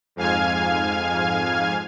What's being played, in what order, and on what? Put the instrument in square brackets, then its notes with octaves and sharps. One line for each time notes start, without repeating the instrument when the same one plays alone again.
[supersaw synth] F2 G#2 F5 G#5 F6 G#6